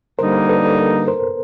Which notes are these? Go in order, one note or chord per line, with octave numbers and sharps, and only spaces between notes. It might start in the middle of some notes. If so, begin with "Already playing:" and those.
D3 G3 A#3 D#4 A#4 C5
A4 B4
A#4 C5